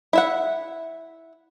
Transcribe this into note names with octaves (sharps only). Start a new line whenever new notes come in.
E4 E5 F#5